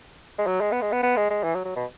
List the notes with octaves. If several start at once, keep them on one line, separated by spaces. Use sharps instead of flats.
G#3
F#3
G#3
B3
G#3
B3
B3
G#3
G#3
E3
F#3
F#3
B2